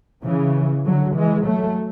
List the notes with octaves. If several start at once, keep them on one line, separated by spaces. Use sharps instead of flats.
C#3 E3
D3 F#3
E3 G#3
F#3 A3